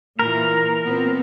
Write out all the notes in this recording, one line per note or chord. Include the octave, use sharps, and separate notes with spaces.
A#2 E3 A#4
A#2 B3 C4